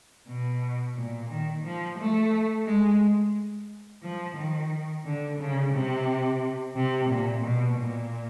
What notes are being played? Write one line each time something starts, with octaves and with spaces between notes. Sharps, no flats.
B2
A#2
D#3
F3
A3
G#3
F3
D#3
D3
C#3
C3
C3
A#2
B2
A#2